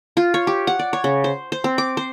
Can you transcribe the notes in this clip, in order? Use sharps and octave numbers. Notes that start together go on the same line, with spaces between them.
F4
C#5
G4
F#5
D5
C#5
C#3
C5
C5
C4
D6
C5